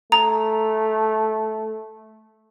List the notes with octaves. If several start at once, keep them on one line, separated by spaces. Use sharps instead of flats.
A3 A#5